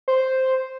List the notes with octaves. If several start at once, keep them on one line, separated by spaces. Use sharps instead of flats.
C5